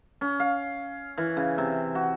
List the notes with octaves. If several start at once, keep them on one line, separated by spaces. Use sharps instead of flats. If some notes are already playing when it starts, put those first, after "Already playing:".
C#4
F5
E3
C#3
C3
F#4